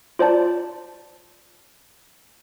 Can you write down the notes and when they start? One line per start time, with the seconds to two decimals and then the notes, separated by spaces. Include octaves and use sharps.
0.19 F4 C5 D5 A5